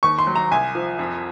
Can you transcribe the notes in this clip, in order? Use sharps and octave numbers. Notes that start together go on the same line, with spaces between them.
D#2 C#6
C6
F#3
A#5
C2 G#5
F3
F2